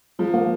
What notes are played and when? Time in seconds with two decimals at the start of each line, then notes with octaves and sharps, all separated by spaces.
0.19 F3 G#3
0.34 A#3